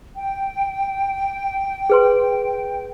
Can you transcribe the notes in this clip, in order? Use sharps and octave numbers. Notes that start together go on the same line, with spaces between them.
G5
G#4 B4 C6